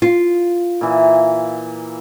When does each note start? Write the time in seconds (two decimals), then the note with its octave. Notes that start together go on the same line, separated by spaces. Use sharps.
0.02 F4
0.81 A#2 E3